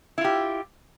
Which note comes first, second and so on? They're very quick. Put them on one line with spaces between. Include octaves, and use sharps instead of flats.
E4 F4 G4